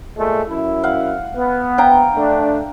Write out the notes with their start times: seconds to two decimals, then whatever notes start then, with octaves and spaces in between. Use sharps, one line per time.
0.17 A#2 G#3 A3
0.48 F#2 E4
0.83 F5 F#5
1.35 B3
1.78 F5 G5 A#5
2.16 A3 D4